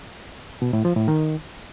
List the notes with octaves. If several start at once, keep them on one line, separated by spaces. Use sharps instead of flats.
B2
A2
F3
A2
D#3